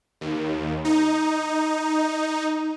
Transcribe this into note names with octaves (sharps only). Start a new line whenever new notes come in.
D#2
D#4